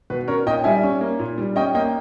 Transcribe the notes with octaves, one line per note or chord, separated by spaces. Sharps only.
B2 B4
C#4 A#4 C#5
A#2 D#5 G5
G3 E5 G#5
C#4
A#3
A#2
G3
C#4 D#5 G5
A#3 D#5 G5